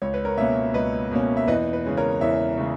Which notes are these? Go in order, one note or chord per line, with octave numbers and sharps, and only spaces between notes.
C#2 C#5
B4
A#4 C#5
B2 A#3 C#4 C#5 E5
C#2 B4 D#5
B2 A#3 C#4
E5
E2 B4 D#5
B4
C#3 G#3 C#4
A#4 C#5
E2 C#5 E5
C#3 G#3